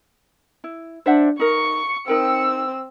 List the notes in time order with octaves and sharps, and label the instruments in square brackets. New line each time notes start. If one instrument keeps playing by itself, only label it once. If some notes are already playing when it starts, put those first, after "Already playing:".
[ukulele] E4
[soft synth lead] D4 [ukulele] C5 E5 F#5
[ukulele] D#4 A#4 [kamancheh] C#6 [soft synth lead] C#7
[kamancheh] C4 E6 [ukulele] D#4 A#4 G5